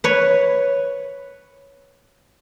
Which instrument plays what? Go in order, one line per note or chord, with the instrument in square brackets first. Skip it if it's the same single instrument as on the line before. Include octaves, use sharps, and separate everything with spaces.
[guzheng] B4 C#5